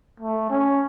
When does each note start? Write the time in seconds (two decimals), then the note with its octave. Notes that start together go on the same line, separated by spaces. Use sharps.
0.20 A3
0.50 C#4